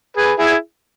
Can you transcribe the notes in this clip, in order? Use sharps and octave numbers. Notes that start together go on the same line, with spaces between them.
G#4 B4
E4 G#4